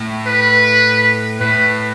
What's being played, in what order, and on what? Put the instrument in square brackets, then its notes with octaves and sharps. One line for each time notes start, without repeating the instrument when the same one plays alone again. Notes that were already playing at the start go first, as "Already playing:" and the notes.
Already playing: [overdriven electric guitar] A2
[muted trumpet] B4
[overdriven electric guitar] A2 [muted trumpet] B4